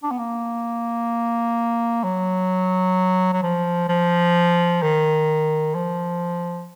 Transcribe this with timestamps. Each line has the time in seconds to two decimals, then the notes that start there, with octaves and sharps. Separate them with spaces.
0.03 D4
0.11 B3
0.19 A#3
2.04 F#3
3.33 F#3
3.43 F3
3.89 F3
4.82 D#3
5.75 F3